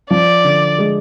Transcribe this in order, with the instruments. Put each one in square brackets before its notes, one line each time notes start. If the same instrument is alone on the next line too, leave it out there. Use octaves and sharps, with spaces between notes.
[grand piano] F3 [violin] D5
[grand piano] D3
G#3